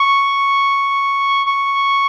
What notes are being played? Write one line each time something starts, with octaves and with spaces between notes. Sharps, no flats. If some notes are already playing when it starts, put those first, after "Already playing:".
Already playing: C#6
C#6